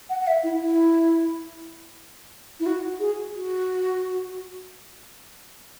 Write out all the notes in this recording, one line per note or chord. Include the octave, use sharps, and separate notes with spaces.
F#5
F#5
E5
E4
E4
E4
F#4
G#4
F#4